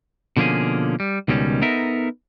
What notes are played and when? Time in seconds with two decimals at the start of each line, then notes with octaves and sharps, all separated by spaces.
0.37 B2 D3 F3 A#3 C#4 G#4
1.00 G3
1.28 C#2 B2 D#3 G3 C#4
1.62 B3 D#4 A4 A#4 D#5 E5